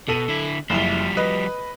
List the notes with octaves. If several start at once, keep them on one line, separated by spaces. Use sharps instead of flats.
B2 A4 D#7 F#7
D3 E4
F#1 F3 G3 E4 G7
B4 D#5 B5